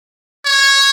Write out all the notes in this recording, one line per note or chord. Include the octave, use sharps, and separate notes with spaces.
C#5